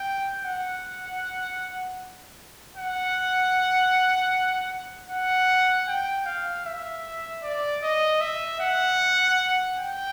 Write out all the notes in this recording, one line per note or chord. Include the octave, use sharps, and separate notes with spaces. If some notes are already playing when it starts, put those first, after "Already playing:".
Already playing: G5
F#5
F#5
F#5
G5
F5
E5
D5
D#5
E5
F#5
G5